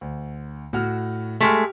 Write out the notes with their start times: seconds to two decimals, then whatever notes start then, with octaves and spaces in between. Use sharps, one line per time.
0.01 D2
0.73 A2 F#4 F6
1.41 G#3 A3 G4 F6